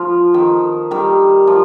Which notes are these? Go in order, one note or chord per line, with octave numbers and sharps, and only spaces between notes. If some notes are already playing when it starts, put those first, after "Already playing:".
Already playing: F3
D#3
D#3 G3
F3